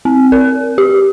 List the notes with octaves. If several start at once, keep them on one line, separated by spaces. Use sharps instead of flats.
C4
A#4
G4